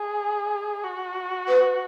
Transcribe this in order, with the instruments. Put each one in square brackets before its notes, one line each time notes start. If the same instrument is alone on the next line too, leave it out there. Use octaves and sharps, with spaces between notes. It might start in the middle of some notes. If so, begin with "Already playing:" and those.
Already playing: [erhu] G#4
F#4
[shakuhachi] B4